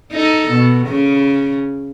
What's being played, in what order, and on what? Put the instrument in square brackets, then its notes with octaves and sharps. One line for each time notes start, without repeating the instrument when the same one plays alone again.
[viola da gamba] D#4 A4
B2
C#3